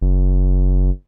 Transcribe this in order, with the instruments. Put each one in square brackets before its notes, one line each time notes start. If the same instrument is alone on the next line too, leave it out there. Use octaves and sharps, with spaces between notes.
[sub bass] F#1